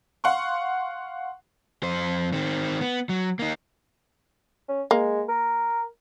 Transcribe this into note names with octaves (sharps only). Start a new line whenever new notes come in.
F5 F#5 C6 C#6
F2 C5
D#3 C4
B3
F#3
A#3 D#4
C#4
G#3 A#3
A#4